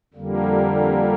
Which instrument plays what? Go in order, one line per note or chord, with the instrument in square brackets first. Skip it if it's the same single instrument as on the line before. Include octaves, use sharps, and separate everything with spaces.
[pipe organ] F2 D3 G3 A#3